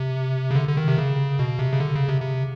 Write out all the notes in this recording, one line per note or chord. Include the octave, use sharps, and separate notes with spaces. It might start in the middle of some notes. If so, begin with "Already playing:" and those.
Already playing: C3
C#3
D3
D3
D#3
C3
C#3
B2
C3
C#3
D3
C#3
C3
C3